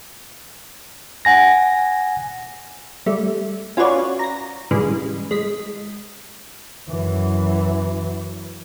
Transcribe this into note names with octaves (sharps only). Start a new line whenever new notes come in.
F#5 G#5 A#6
G3 A3
C#4 F4 F#4 B4 C#5 D5
A#5 A#6
G#2 C#3 E3 G3 G#3
G#3 D#5 B6
F#2 E3